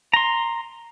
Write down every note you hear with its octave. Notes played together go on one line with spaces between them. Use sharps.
A#5 C6